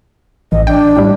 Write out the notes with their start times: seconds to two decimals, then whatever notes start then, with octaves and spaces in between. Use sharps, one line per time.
0.52 A1 D#5
0.67 D4 G5
0.97 A2 G3